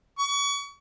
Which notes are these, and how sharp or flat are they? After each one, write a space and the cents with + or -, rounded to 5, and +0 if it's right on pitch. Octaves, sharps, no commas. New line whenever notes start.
C#6 +35